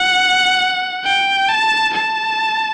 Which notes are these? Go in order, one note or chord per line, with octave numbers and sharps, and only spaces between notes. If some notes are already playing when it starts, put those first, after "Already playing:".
Already playing: F#5
G5
A5
A5